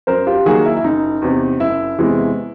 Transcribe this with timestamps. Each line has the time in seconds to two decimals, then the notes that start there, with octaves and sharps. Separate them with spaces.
0.07 F#2 A#4 C5
0.27 F4 G4
0.45 D#3 F#3 A#3 F#4 G#4
0.65 E4
0.76 E4
0.84 F#1 D#4
1.22 E2 C3
1.60 F#1 E4
1.98 E2 C3 E3 G#3